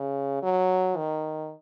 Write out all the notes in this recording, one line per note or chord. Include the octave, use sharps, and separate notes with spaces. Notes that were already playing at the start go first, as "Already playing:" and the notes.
Already playing: C#3
F#3
D#3